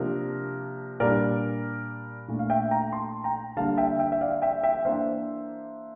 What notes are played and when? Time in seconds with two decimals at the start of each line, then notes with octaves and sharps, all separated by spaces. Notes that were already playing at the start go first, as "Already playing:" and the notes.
Already playing: C3 F3 A#3 D4 A#4
1.00 A#2 G3 D4 A#4 D5
2.28 A#2 A3 D4
2.39 F5
2.50 E5 G5
2.71 G5 A#5
2.93 A5 C6
3.24 G5 A#5
3.57 D3 G3 A#3 D4 F5 A5
3.77 E5 G5
3.99 E5 G5
4.12 E5
4.21 D5 F5
4.42 E5 G5
4.63 E5 G5
4.85 E3 A#3 D4 C5 E5